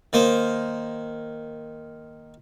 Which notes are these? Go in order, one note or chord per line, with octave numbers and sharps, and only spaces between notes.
D#3 A#3 C5